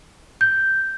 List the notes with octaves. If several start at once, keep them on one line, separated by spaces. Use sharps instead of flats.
G6